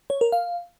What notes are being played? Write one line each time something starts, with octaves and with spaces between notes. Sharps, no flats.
C#5
A#4
F5